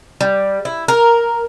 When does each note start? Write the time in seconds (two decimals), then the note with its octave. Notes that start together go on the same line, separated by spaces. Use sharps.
0.21 G3
0.65 E4
0.88 A#4